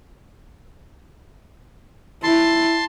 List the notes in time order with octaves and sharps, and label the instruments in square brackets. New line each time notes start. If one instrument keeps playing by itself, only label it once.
[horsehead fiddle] E4 [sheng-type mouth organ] A5 C6